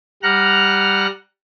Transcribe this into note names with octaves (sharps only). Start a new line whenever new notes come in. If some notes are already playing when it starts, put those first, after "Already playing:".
G3 F#5 A#5 F6 F#6